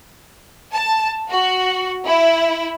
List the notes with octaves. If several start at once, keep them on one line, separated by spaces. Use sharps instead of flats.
A5
F#4
E4